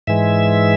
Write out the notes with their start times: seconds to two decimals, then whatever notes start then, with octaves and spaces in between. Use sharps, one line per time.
0.07 G#2 E3 G#3 E5